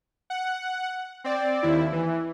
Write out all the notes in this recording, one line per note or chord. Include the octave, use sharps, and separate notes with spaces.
F#5
C4 D5
D#2 E4
E3